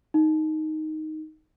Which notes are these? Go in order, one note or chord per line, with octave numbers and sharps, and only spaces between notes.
D#4